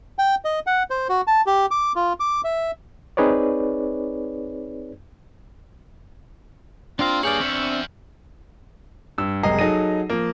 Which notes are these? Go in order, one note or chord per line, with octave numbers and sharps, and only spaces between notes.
G5
D#5
F#5
C5
F#4
A5
G4
D6
F4
D6
E5
C4 D#4 G#4 B4 C#5 D5
A#3 C4 D4 F4 F5 A#5
G2 G#4 C#5 D5 F6 G6 F#7
E2 C4 D4 E5 C#6
G2 E6
F#1 C3 G#3 D#5 A#5 C7
F#3 D#4 G#4 A4 A#6 D#7
F3 A#3